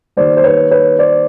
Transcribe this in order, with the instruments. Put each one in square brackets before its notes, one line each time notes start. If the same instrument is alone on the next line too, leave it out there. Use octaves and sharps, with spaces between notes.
[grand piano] D#3 G3 A#3 C5 D5
C5
B4 C#5
B4 C#5
C5 D5